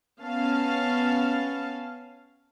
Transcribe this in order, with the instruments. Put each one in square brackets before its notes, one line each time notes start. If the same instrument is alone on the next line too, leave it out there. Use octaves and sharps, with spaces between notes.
[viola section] B3 C#4 F5 A5